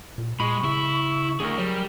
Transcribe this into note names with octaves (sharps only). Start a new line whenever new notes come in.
A#2
A#2 G#3 B5 C#6
C#3 E4
D2 G#4 A#4
F#3 G3